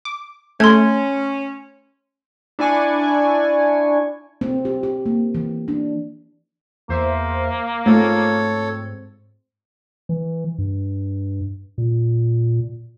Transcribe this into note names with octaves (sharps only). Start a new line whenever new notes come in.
D6
A3 C#4 C6 G#6
D4 E4 D5 G#5 C#6
C4
G4
G4
A#3
E3
D4
E2 A#3 C5 E5
G#2 A3 C4 F4 A4 C#5
E3
G2
A#2